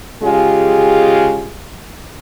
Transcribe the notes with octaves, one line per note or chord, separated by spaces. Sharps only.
C#3 G#3 F4 G4